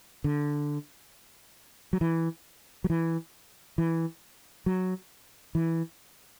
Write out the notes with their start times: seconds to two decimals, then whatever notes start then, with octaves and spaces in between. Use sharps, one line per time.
0.24 D3
1.93 F#3
2.01 E3
2.84 F#3
2.90 E3
3.78 E3
4.66 F#3
5.55 E3